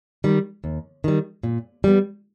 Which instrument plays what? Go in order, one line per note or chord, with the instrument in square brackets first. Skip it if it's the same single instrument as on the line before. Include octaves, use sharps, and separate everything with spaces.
[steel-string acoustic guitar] D#3 G3
D#2
D#3 G3
A#2
G3 B3